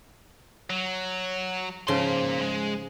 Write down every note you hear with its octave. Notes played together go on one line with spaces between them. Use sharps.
F#3
G#2 C#3 F3 A#3 C6
G#3